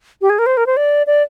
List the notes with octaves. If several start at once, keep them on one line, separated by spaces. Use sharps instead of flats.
G4
G#4
A#4
C5
A#4
C5
D5
D5